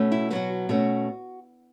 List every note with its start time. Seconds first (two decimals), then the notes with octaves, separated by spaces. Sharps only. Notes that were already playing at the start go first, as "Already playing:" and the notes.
Already playing: B2 A3 C#4
0.12 E4
0.30 B2 F#3 B3 F#4
0.69 B2 A3 C#4 F#4